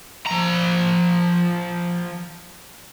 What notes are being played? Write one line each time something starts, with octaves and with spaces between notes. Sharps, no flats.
F3 A#5